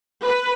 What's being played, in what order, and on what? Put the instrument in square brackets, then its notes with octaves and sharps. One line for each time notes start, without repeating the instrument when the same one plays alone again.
[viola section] B4